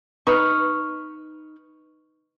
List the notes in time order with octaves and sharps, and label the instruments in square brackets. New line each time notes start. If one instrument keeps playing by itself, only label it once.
[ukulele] D#4 B4 [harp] C#6 F6